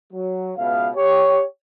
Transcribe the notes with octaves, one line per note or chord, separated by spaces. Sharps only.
F#3
C#2 B2 B3 E5 F5
G4 C#5